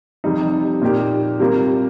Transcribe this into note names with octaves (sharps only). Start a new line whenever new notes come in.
F2 C3 G3 D#4
A#2 A#3 D#4 G4
C3 G3 A#3 F4 A#4